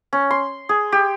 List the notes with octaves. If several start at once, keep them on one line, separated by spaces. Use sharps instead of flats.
C#4
C6
G#4
G4